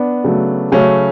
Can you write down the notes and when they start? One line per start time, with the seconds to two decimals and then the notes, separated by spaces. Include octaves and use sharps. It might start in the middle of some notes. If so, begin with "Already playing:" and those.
Already playing: B3 D4
0.24 C#3 F#3 A3
0.72 C#3 F#3 A3 C#4